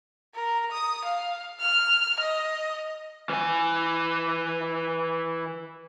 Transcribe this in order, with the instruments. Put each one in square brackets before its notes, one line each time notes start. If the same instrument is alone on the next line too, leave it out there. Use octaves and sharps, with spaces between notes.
[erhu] A#4
D#6
F5
F6
D#5
[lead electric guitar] E3 G#5